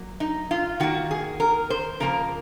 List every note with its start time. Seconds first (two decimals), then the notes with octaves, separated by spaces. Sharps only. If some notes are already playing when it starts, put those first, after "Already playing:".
Already playing: F#3 A#3
0.20 D#4
0.51 F4
0.80 D#3 A#3 F#4
1.11 G#4
1.40 A#4
1.70 C5
2.00 C#3 F3 A#3 A#4